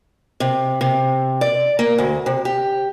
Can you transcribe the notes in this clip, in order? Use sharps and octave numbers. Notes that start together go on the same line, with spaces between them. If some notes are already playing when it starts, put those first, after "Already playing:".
C3
C3
D5
A#3
D2
C3
G4